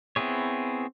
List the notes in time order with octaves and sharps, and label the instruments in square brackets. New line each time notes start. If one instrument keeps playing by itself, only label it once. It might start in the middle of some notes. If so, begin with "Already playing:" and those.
[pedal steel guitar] B3 C4 E4 G#4 C#5